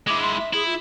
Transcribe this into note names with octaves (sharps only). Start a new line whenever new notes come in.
G#3 E4 D6
C6
E5
E4 G#4
F4